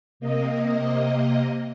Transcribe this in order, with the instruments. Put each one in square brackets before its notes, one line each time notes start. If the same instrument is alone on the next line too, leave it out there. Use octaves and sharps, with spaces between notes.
[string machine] C3 A#3 D#5